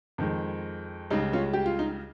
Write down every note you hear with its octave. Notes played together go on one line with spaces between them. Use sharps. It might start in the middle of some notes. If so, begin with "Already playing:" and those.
F2 D#3 G#3
C#2 C#3 G3 D#4
C#4 F4
G4
F4
D#4